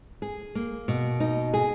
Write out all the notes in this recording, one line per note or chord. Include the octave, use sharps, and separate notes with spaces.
G#4
A#3
B2
D#4
G#4